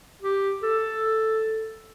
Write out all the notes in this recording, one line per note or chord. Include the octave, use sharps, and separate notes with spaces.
G4
A4